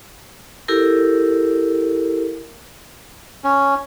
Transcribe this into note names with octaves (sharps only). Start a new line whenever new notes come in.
E4 G4 A4 A#4
C#4